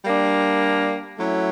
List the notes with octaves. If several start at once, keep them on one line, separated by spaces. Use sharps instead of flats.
G3 A#3 D4
F#3 A3 C#4 E4